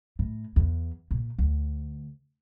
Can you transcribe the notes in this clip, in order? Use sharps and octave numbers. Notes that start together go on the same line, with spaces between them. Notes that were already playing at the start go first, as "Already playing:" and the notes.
A2
E2
A#2
D2